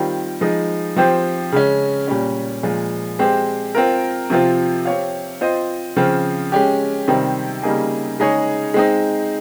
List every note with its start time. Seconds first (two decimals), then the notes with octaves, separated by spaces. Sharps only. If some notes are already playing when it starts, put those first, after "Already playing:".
Already playing: D#3 G3 C4 F4
0.41 F3 G#3 D#4
0.96 F3 C4 G4 C5
1.52 C#3 G#3 C#4
2.08 A#2 G3 C#4
2.63 A#2 F3 G#3
3.19 G#3 C4 G4 C5
3.75 C4 F4 A#4
4.30 C3 F3 C4 F4
4.85 C4 G4 C#5 F5
5.41 C4 F4 C5 D#5
5.96 C#3 F3 C4
6.52 G#3 C#4 G4
7.08 C3 D#3 G3 C4
7.63 C#3 G3 A#3 D#4 G#4
8.19 C#3 G#3 D#4 G#4 C#5
8.74 G#3 C4 D#4